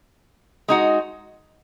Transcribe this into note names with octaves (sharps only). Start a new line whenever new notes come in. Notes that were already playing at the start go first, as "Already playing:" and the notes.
G#3 D#4 F#4